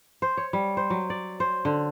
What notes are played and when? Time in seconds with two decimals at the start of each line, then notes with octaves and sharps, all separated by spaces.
0.22 C5
0.37 C#5
0.53 G3
0.77 C5
0.90 F#3
1.10 D5
1.40 C5
1.65 D3